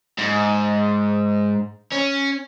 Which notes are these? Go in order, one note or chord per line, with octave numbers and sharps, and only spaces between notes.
G#2
C#4